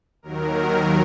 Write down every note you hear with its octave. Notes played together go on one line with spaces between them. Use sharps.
D#2 D#3 F#3 A#4